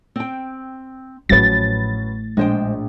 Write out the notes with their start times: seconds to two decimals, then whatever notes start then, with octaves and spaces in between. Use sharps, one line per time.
0.16 C4 G5
1.29 A1 A2 F3 F#3 C#4 B4 A6
2.37 A#1 G#3 C5 G5